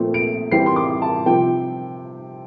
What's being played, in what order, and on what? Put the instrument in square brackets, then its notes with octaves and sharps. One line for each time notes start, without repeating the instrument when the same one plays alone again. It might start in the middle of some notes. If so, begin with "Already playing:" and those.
Already playing: [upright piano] A#2 F3 A3 C4
D7
E3 G3 C4 C7
C6
D6
A5
C3 F3 C4 G5